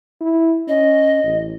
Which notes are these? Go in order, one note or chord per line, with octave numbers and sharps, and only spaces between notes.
E4
C#4 D#5
A1